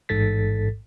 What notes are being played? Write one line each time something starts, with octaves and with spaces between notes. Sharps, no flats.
A1 G#2 A4 A6 B6